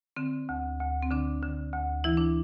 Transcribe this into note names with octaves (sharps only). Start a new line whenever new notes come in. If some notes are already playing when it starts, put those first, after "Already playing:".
D3 C4
D2
D2
C4
D3 D4
D3
D2
E3 E4
D4